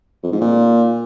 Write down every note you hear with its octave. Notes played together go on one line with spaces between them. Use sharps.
F2
G#2
A#2